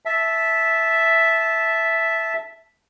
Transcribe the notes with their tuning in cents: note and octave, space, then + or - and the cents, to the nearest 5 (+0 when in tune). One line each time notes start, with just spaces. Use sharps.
E5 +0 A5 -10